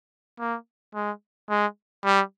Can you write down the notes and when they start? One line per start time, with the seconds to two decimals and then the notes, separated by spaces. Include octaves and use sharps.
0.39 A#3
0.94 G#3
1.50 G#3
2.04 G3